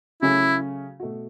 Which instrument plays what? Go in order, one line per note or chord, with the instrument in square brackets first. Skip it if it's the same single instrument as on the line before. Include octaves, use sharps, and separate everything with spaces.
[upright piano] C#3 F#3 A3 C#4 [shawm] E4
[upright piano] B2 A3 F#4